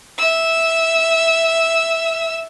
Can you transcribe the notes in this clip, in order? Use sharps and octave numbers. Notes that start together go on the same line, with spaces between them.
E5 E6